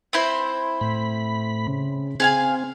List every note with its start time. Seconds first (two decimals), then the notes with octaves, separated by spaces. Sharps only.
0.13 C4 E4 C5
0.81 A2 B5
1.68 C#3
2.20 C4 G#4 F5 G#5